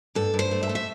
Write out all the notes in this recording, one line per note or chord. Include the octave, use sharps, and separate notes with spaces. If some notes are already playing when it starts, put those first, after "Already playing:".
G2 A4
G2
C5
A3
E5
A3
E5